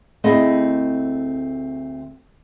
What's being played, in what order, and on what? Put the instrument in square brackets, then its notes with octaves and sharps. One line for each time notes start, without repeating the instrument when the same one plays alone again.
[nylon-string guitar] D2 A3 C4 E4 G#4 D#5